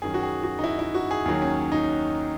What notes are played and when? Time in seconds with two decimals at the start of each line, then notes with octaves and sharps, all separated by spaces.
0.02 F#2 D#3 F#3 G#4
0.14 F#4
0.23 G#4
0.43 F#4
0.59 D#4
0.64 E4
0.79 E4
0.95 F#4
1.11 G#4
1.25 D#2 D#3 F#3 G#4
1.42 C#4
1.72 D#4